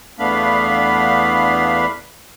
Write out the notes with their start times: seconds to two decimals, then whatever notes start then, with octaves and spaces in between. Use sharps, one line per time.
0.19 E2 A3 B3 D4 F5 B5